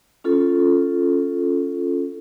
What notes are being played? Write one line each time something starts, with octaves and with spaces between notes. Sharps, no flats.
C#4 F4 A4